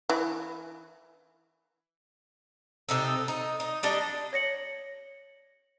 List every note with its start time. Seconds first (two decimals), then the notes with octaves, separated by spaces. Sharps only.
0.09 E3
2.89 C3 D#4 A4
3.28 D#4
3.60 D#4
3.83 G3 D4 D#5
4.33 C#5 A#6 C#7 F#7